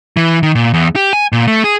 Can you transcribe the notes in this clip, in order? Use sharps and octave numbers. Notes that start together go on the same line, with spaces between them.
E3
D#3
A#2
E2
G4
G#5
A#2
A3
G#4